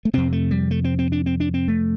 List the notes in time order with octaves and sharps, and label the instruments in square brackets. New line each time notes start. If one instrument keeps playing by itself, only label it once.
[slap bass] A3
F2 C3 C4
A3
G3
A3
C4
C4
D4
C4
D4
C4
A3